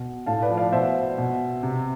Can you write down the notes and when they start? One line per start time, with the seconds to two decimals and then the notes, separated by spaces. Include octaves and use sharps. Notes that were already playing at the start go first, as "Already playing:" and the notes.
Already playing: B2
0.26 A2 F5 A5
0.42 B4 D5
0.49 F3
0.57 D5 F5
0.72 B2 C5 E5
1.18 B2
1.63 C3